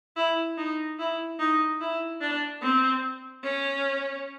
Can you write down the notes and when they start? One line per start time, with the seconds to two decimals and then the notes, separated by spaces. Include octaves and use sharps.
0.17 E4
0.57 D#4
0.99 E4
1.39 D#4
1.80 E4
2.21 D4
2.62 C4
3.43 C#4